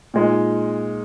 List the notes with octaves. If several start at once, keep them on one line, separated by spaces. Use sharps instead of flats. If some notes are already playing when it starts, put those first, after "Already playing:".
A#2 G#3 D#4